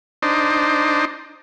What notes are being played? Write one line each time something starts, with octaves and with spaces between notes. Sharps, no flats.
D4 D#4 C5